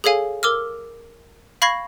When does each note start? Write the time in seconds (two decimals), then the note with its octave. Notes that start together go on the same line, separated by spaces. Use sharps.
0.04 G#4 A4 C#5 F5 G#5
0.43 A#4 D6 E6 F6
1.62 F5 B5 C#6 G#6 A#6 C7